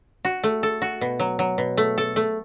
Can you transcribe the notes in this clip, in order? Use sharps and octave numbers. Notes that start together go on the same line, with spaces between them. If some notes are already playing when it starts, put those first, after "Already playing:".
F#4
A3
A4
F#4
B2
F#3
F#3
B2
A3
A4
A3